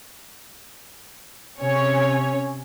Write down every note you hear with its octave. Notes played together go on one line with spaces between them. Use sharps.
C3 C#4 C#5